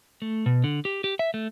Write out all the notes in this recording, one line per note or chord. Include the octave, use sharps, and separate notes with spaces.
A3
B2
D3
G4
G4
E5
A3